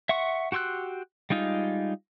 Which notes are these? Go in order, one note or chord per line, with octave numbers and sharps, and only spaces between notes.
E5 F#5 C6 C#6
F#4 G4 C6 E6 F#6
G3 G#3 D#4 F4